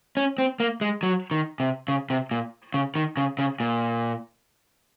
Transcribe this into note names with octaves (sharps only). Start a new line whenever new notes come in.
C#4
C4
A#3
G#3
F#3
D#3
C3
C#3
C3
A#2
C#3
D#3
C#3
C#3
A#2